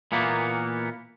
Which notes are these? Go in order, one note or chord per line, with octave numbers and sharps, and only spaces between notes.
A#2 E3 A#3 B3